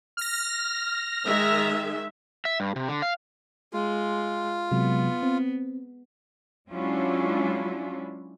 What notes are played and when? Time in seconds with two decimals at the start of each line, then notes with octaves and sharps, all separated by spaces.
0.17 F6 A#6
1.24 D#3 G#3 E5
2.45 E5
2.60 G2
2.76 C3
2.88 D3
3.02 F5
3.73 G#3 F4
4.71 C3 F#3 G#3 B3
5.23 C4
6.70 F#3 G#3 C#4 D4 E4 F4